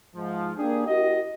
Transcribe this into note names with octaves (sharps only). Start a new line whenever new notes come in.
G#2 F3
A#3 D4 G4 G#4
E4 F#4 G4 A#4 D#5